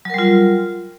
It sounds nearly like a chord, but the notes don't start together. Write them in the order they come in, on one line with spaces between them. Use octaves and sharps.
F#3 A#4 G3 F4